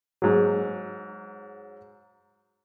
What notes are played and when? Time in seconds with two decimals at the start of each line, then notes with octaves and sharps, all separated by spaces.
0.22 G#2 F#3